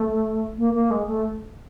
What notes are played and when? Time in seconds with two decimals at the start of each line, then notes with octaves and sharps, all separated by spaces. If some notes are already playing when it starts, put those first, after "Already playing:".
Already playing: A3
0.58 A#3
0.74 A#3
0.91 G#3
1.07 A3